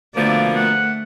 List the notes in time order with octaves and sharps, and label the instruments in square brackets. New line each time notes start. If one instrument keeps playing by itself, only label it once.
[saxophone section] B2 F3 A#3 [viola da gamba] D3 A3 [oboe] D5
[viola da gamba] A3 [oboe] F#5